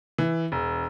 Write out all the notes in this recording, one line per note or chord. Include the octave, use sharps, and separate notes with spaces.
E3
E1